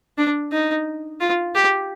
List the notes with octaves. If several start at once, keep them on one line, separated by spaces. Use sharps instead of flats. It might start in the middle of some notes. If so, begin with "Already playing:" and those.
D4
D#4
F4
G4